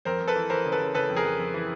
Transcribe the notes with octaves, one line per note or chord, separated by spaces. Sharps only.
F2 A#4 C5
F2
A4 B4
E3
E3 A#4 C5
C#3
A4 B4
C#3
C#3 A4 B4
F2
G#4 A#4
F2
F2
E3